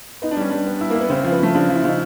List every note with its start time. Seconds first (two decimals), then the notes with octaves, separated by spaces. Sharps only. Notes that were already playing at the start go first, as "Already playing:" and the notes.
0.22 B3 D#4
0.31 D4
0.37 G3 C#4
0.50 G3 D4
0.66 B3
0.81 E4
0.90 A#3
0.95 E4
1.01 B3
1.10 C#3 C4
1.21 F3 C4
1.32 B3
1.39 F3 A3
1.55 C#3 D4
1.69 F3
1.76 E4
1.84 C#3 D#4